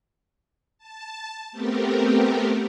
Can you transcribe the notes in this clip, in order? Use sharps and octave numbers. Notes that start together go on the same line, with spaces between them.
A5
A3 B3 C4 G4 A#4